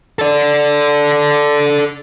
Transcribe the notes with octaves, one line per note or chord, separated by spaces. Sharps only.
A4 D5